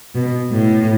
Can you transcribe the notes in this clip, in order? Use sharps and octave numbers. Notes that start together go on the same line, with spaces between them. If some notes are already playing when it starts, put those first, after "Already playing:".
B2
A2